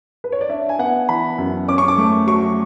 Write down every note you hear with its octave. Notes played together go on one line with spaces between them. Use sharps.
B4
C#5
D5
D4 E5
G#5
B3 F#5
E3 B5
F#2
C#4 D6
C#6
D6
A3
F#3 C#6